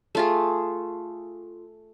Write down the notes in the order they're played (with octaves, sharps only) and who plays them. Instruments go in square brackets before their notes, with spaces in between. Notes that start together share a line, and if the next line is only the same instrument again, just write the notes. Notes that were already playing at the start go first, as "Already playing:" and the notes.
[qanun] A3 F4 G#4